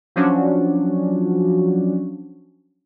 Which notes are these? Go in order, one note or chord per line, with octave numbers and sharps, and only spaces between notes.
F3 F#3 C#4 D4 F#4